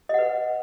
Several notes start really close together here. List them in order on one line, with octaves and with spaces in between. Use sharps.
D#5 F#5 B4